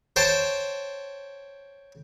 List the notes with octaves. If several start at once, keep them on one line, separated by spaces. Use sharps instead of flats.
C5 C#5 G5 A5